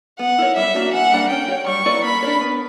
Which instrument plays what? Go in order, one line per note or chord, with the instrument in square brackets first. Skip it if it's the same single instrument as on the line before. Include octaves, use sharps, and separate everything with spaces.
[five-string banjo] B3 [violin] F#5
[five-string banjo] E4 A#4 C#5
[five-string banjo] G3 [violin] E5
[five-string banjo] A#3 D4 F#4
[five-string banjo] E3 [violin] F#5
[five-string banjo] G3 A#3 D4
[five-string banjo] C#4 [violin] G5
[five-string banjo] F#4
C#5
[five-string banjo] G3 [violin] C#6
[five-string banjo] A#3 E4 B4 D5
[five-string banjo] A#3 [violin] B5
[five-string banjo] D4 A#4 C#5
B3